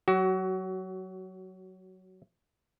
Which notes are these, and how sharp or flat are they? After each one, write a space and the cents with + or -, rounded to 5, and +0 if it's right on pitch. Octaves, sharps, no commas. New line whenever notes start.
F#3 +10 F#4 +30